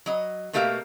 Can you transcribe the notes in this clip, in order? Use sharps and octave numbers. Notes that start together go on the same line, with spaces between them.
F#3 D#5
B2 A3 A#3 G4 E5 F5